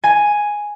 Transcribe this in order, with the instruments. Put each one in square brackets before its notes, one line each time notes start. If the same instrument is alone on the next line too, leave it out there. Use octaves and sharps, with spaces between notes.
[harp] G#5